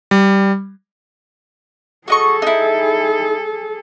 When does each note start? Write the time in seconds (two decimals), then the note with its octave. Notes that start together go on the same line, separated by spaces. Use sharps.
0.11 G3
2.08 F#4 G#4 A4 D#5 C#6
2.42 D#4 E4